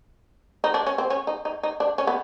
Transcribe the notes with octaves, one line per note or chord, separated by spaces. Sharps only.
D#4
D4
C#4
C4
C#4
D#4
D#4
D#4
D4
C#4
B3